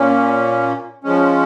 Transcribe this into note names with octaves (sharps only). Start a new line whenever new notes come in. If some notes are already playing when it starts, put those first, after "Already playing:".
Already playing: A#2 A#3 C#4
F3 G#3 C#4